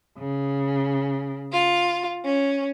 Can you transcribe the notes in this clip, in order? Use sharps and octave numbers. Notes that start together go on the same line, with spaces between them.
C#3
F4
C#4